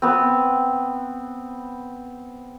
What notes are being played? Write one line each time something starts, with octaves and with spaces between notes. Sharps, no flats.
B3 C4